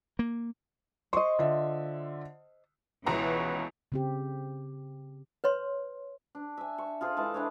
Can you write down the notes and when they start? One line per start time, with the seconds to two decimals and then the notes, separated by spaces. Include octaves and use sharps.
0.19 A#3
1.13 C5 D#5 C6 C#6
1.39 D3 F4 E5
3.06 C#2 B2 E3 F#4 B4 C#5 A#5
3.92 C#3 C4 G4
5.44 B4 C#5 C6
6.35 D4
6.57 E5 G#5
6.78 C#6
7.01 F4 G#4 A4 C5
7.17 E3 G#3 A5
7.34 D4 G#4 B4 C#5